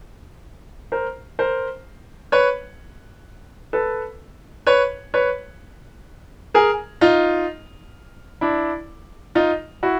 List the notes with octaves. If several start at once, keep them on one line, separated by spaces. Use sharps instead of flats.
A#4 C5
A#4 C5
B4 C#5
A4 B4
B4 C#5
B4 C#5
G#4 A#4
D#4 F4
D4 E4
D#4 F4
E4 F#4